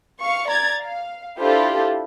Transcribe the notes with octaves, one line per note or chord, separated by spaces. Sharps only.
F5 C#6
D5 A#5 G#6 A6
F5
D4 E4 F4 G4 A4 C5